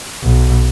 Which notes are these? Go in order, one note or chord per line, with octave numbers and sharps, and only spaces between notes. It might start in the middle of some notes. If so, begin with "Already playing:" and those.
B1